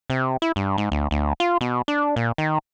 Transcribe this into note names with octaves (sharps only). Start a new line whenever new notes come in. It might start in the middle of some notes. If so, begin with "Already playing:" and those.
C3
E4
G2
G#2
D2
D2
F4
B2
D4
A#2
D#3